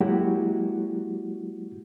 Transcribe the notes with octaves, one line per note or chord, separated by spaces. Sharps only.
F#3 G#3 A#3 E4 F#4 G4